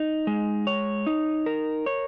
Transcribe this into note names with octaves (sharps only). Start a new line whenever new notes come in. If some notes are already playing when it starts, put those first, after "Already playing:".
Already playing: D#4
G#3
C#5
D#4
A#4
C#5